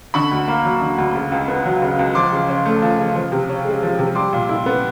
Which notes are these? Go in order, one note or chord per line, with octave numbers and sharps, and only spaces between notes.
D3 B5 C#6
D2
A#3
F#3
D3
D2
C#3
C#2
B3
F#3
C#3
C#2
F3 C6 D6
C#3
C#4
A3
F3
C#3
F3
C3
C#4
G#3
F3
C3
G3 C6 D6
A#2
E4
B3